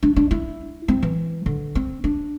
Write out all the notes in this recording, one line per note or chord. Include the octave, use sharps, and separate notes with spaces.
D4
D4
E4
C4
E3
D3
C4
D4